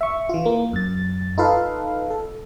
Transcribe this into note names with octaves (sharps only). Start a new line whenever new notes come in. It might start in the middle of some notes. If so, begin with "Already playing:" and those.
E5 C#6
E3 F4
A#3
F#2 A6
D#4 F4 A4 B4 F5
A4